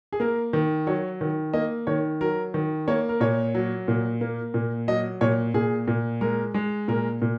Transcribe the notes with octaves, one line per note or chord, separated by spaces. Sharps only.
G#4
A#3 A#4
D#3
F#3 C#5
D#3
A#3 D#5
D#3 C#5
F#3 A#4
D#3
A#3 C#5
A#4
A#2 C#5
F#3
A#2
A#3
A#2
F#3 D#5
A#2 C#5
A#2 G#4
A#2
G#3 A#4
G#3
A#2 A#4
A#2